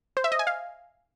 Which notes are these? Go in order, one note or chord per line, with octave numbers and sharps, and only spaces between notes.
C5
E5
D#5
G#5
F5